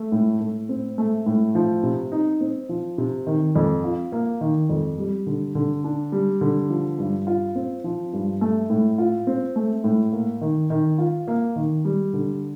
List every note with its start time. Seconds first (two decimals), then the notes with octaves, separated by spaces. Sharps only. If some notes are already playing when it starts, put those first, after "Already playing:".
Already playing: A3
0.12 A2
0.40 A2
0.69 C4
0.98 A3
1.26 A2
1.55 F3
1.83 C3
2.12 D#4
2.41 C4
2.69 F3
2.98 C3
3.27 D#3
3.56 F2
3.84 F4
4.12 A#3
4.41 D#3
4.69 F2
4.98 G3
5.27 D3
5.55 D3
5.84 D4
6.12 G3
6.41 D3
6.70 F3
6.99 G2
7.27 F4
7.55 C4
7.84 F3
8.13 G2
8.41 A3
8.70 A2
8.98 F4
9.27 C4
9.56 A3
9.84 A2
10.13 A#3
10.41 D#3
10.70 D#3
10.98 F4
11.28 A#3
11.56 D#3
11.85 G3
12.13 D3